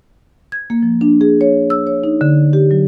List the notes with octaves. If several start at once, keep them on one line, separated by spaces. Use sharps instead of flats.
G#6
A#3
F3
D4
G#4
C#5
E6
C#5
D#4
D3
G4
F#3